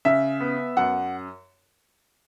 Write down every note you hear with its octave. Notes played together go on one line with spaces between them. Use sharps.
C#3 E5
B3
F#2 F#5